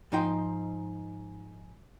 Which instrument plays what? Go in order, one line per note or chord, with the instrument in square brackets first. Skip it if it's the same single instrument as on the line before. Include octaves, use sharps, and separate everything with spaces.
[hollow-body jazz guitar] G#2 F3 D#4 C5 G5